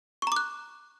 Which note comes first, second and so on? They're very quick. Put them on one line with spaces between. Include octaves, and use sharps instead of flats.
C#6 A#5 D6 F#6